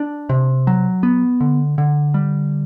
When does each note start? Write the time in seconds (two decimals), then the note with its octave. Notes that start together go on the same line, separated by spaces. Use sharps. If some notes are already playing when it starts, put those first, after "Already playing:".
Already playing: D4
0.29 C3
0.67 F#3
1.03 B3
1.41 D3
1.78 D3
2.14 G3